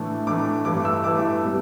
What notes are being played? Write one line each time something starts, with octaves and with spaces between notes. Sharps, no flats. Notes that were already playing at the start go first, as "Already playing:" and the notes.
Already playing: A2 E3 A3 D4
A2 E3 A3 D4 D6
G2 E3 A3 E4 D6
E6
G2 E3 A3 E4 D6
B2 G3